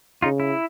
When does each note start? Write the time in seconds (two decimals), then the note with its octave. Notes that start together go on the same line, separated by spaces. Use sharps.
0.22 C#3 D#4 F4
0.40 E4